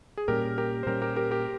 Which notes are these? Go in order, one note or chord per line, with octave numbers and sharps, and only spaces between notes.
G#4
A#2 G3 C#4 G4 A#4
G4 A#4
C5
A#2 G3 C#4 G4 A#4
G4 A#4
G4 A#4
G4 A#4